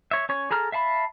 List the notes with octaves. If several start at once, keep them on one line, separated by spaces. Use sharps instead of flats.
C#5 E5
C#4 C#5
G#4 A4 A#5 F6
E5 F5 A5 B5